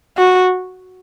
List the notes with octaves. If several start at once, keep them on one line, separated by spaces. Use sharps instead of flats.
F#4